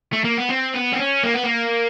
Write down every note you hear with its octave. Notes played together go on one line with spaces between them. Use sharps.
A3
A#3
B3
C4
B3
C4
C#4
A#3
B3
A#3